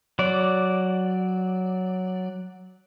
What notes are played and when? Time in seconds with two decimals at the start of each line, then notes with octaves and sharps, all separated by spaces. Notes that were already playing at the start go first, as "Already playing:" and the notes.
0.19 F#3 D5